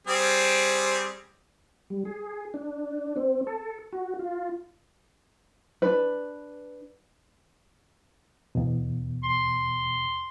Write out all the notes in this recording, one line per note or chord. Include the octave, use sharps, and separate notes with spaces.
G3 C4 G#4
G3
G#4
D4
C4
A4
F#4
F4
D4 B4
E2 B2
C6